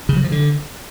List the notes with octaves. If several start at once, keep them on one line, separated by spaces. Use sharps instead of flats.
C#3
F#3
F3
D3